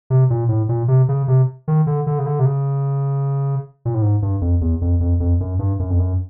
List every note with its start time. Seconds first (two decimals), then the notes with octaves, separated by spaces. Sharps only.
0.10 C3
0.30 A#2
0.49 A2
0.69 A#2
0.88 C3
1.09 C#3
1.28 C3
1.68 D#3
1.87 D3
2.07 D3
2.19 C#3
2.26 D3
2.39 C3
2.45 C#3
3.85 A#2
3.94 A2
4.02 G#2
4.22 G2
4.41 F2
4.61 E2
4.81 F2
5.00 F2
5.20 F2
5.40 F#2
5.59 G2
5.79 F#2
5.90 F2
5.99 F#2